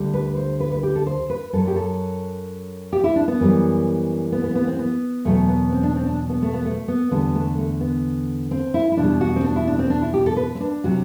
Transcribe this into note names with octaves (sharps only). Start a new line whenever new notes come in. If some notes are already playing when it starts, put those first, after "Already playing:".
Already playing: D2 D3 G3
B4
C5
B4
B4
G4
A4
C5
B4
F#2 F#3 A4
G4
A4
G4
E4
D4
B3
F#2 E3 G3
B3
B3
B3
C4
B3
E2 B2 F#3 A3
B3
C4
D4
C4
D4
B3
A3
B3
A3
B3
E2 D3 G3 B3
A3
A3
B3
C4
E4
E4
E2 B2 G3 D4
F#4
C4
D4
E4
D4
C4
D4
E4
G4
A4
B4
C4
D4
C3 F#3 F#4